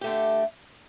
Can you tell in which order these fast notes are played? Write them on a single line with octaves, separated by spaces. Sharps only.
G4 A3 D3